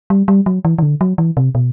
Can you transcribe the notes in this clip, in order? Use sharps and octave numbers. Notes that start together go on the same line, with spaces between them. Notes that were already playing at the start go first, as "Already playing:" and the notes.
G3
G3
F#3
E3
E3
D3
F#3
E3
C3
B2